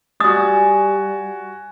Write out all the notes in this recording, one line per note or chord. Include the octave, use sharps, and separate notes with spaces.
G3 F#4 G#5 D#6 A6